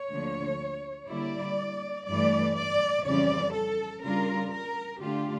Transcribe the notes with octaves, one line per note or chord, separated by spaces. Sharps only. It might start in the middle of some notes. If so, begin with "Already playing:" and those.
Already playing: C#5
D2 D3 F3 A#3
D3 G3 A#3 E4 D5
G2 E3 A3 D5
D5
F2 C#3 E3 G3 C#4 D5
A4
C#3 G3 D4 F4 A#4
A#4
D3 A3 D4 F4 G4